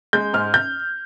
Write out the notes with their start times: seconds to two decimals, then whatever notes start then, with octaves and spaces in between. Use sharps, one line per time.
0.13 G#3 G6
0.34 G#2 F6
0.54 G6